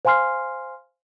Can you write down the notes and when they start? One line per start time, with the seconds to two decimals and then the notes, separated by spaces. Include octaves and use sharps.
0.05 C5 F5 G#5 C6 F6 C7